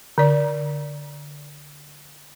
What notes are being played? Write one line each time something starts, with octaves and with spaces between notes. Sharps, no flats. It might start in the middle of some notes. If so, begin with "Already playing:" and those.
D3 D5